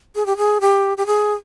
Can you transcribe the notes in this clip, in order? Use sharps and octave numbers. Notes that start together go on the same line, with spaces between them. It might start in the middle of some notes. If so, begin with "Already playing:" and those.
G#4
G4
G#4
G4
G4
G#4